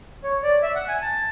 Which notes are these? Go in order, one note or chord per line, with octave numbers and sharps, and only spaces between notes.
C#5
D5
E5
F#5
G#5
A5